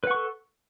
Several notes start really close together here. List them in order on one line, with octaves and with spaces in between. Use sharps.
B4 F#5 C#6 A4